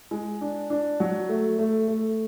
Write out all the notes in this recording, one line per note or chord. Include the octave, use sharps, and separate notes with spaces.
G#3
D4
D4
F#3
A3
A3
A3